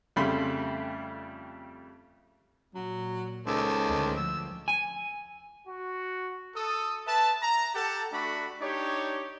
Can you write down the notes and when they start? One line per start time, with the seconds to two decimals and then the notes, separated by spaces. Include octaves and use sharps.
0.16 F2 C#3 G3 A3 B5 C6
2.75 A#2 F#3
3.47 C#2 D#3 A4 C5
3.88 D2 G#3
4.16 F3 E6
4.68 G#5
5.68 F#4
6.56 A4 D#6
7.07 B4 E5 A5
7.41 A#5
7.75 G4 A4 F#5 A5
8.12 A3 D4 F#4 D5 B5
8.61 D4 D#4 G4 C#5